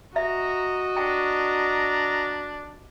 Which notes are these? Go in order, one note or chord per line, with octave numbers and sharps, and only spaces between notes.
F#4 D#5 E5 A#5
D4 G5 A#5